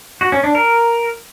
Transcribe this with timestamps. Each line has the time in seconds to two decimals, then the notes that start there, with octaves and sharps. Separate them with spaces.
0.21 F#4
0.32 C#4
0.44 D4
0.55 A#4